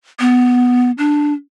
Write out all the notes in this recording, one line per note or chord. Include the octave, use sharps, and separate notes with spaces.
B3
D4